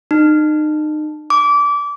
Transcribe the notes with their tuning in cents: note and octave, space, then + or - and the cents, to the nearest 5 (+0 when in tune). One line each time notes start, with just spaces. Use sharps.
D#4 -30
D6 -25